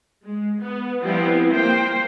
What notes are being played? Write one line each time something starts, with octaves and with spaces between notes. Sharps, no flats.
G#3
B3
F3 G3 B3 C4 E4
A#3 C5 G5